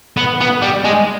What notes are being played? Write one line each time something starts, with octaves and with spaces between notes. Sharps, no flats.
B3
B3
G3
G#3